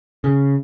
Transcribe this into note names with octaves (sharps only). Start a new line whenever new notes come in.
C#3